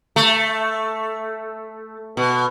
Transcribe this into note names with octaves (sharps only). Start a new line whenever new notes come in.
A3
B2